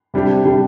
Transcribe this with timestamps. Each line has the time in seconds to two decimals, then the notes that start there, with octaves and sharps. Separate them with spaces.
0.14 C3 G3 D4 G4
0.45 C3 G3 D4 G4